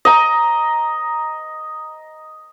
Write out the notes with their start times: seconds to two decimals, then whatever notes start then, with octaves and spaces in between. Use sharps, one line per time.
0.05 D#5 A#5